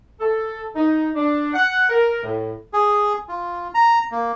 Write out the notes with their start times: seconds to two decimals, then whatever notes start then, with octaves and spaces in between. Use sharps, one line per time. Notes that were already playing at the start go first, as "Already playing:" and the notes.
0.20 A4
0.76 D#4
1.16 D4
1.54 F#5
1.89 A#4
2.23 A2
2.73 G#4
3.29 F4
3.75 A#5
4.12 A#3